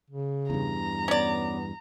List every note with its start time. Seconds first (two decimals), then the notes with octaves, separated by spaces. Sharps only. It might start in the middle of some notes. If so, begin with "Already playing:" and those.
0.10 C#3
0.50 E2 G2 A#5
1.08 B3 C#4 D5